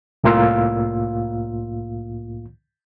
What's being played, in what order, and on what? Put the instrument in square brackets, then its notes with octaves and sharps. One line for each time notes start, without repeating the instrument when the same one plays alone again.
[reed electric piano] C2 A2 A#3 F4 F5 E6